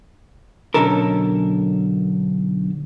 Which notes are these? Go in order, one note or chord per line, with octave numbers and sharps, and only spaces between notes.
B1 G2 D3 C#4 A4 A#4